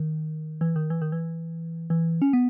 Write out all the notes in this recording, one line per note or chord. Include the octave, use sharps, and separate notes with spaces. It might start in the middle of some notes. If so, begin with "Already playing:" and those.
Already playing: D#3
E3
D#3
E3
D#3
E3
E3
C#4
B3